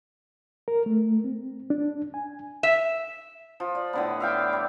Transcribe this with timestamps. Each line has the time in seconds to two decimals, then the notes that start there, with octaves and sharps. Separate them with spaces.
0.68 A#4
0.86 A3
1.24 C4
1.70 D4
2.14 G#5
2.63 E5
3.60 F3
3.75 D5
3.93 A2 D3 B3
4.20 E5 F5 G5 D6
4.53 G3